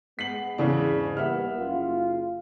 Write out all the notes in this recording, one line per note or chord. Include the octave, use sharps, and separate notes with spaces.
G#3 B3 B6 C7 F#7
E2 G#2 C#3 E3 D4
G3 A#3 B3 E5 F#5 F6
F#1 C#3 F4